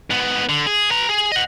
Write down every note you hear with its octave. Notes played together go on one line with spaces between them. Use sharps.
G#2 B3
D3
G#4
B4 A#5
G#4
D#5 F#5